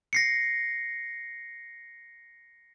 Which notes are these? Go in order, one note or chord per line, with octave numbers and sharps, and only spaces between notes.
A#6 C7 C#7